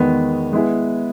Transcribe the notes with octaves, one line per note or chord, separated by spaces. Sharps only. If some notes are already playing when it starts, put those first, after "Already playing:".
Already playing: E2 D#3 G#3 B3
G#3 B3 E4 G#4